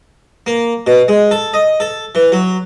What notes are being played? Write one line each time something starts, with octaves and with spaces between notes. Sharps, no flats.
A#3
B2
G#3
A4
D#5
A4
E3
F#3